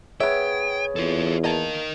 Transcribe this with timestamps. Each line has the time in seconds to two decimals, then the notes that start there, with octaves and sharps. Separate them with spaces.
0.20 B3 G#4 C#5 E5 G5
0.96 E2 F4 A4
1.44 A#3 A#4 D#5 A5